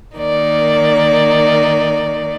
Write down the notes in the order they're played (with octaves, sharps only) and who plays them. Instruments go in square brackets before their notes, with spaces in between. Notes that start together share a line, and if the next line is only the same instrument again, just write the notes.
[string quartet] D#3 A#3 D#4 D5